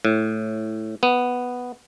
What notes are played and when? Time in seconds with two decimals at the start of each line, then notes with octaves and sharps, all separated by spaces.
0.05 A2
1.03 B3